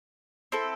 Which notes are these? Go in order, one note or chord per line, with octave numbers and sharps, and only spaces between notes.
C4 E4 A4